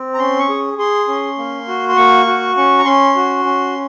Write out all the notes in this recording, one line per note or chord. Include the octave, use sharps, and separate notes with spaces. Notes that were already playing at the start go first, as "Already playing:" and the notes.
Already playing: C4
A#5
C#4 C6
C#6
G#4
G#4 C6
C#4
A#3
F#4
C6
A#3 C#6
F#4
C#4 C#6
A#5
C#4 C6
F#4
C#4